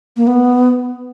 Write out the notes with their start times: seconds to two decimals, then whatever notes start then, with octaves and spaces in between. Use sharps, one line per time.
0.17 A#3
0.27 B3